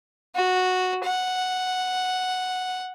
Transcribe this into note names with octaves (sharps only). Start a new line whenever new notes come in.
F#4
F#5